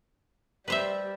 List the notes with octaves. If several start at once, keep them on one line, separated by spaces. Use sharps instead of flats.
G3 B4 C5 E5